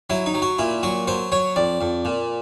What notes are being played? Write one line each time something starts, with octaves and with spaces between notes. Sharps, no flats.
F#3 E4
D#4
F#3
F#4
A#2 E4
F#3 F#4
F#3 C5
F#3 C#5
F2 D5
F2
A#2